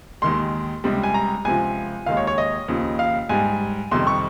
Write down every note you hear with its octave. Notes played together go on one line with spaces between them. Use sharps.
D#2 D#3 G#3 C6
C#2 C3 G3
G#5
A#5
C#2 C3 F3 G#5
D#2 D#3 G#3 F5
C#5
C#5
D#5
D#2 C#3 F3
F5
G#2 G3 G#5
F2 C3 D#3 G3 C6
C#6